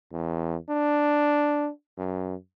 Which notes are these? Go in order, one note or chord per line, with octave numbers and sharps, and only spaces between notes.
E2
D4
F#2